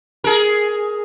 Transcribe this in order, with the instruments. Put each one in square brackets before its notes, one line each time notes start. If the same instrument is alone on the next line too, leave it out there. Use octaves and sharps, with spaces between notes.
[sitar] G#4 A#4